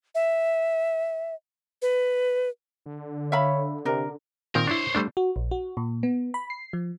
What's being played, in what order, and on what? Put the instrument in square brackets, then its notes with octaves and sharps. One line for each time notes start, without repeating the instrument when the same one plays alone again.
[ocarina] E5
B4
[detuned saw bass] D3
[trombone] C#5 [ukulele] E5 F5 B5
[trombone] C3 [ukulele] D4 A#4
[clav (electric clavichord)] A#2 D#3 C4 [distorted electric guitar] A#4
[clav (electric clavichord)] D4 E4 [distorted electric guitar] C5 C#5
[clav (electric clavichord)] G3 A3 D4
[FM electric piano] F#4
A#1
F#4
A#2
B3
B5
C7
F3